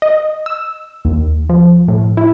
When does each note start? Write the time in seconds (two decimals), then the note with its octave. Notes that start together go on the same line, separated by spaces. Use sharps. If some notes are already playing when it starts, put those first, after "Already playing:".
0.02 D#5
0.46 E6
1.05 D#2
1.49 F3
1.88 A2
2.17 E4